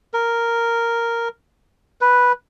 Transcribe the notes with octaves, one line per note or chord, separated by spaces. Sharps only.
A#4
B4